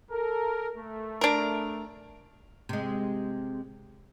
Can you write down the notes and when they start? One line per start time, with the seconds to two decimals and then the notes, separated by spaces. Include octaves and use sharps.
0.11 A4 A#4
0.77 A3
1.21 D4 A#4
2.69 C3 G#3